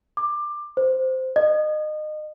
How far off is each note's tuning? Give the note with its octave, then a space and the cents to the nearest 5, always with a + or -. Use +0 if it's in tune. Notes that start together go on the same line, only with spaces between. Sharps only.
D6 +20
C5 -10
D#5 -25